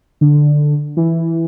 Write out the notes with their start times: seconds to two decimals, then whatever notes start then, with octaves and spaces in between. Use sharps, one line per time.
0.21 D3
0.97 E3